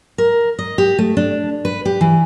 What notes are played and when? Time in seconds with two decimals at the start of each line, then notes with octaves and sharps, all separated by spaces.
0.18 A#4
0.59 D#5
0.78 G4
0.99 A3
1.17 D4
1.65 B4
1.85 G4
2.01 E3